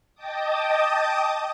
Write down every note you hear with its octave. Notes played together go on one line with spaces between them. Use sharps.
D#5 G5 A5 D6 D#6